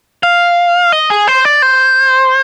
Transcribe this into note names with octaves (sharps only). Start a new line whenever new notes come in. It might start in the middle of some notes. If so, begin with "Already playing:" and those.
F5
D#5
G#4
C5
D5
C5